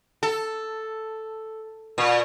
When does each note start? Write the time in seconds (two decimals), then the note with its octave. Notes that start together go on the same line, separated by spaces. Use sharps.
0.23 A4
1.98 A#2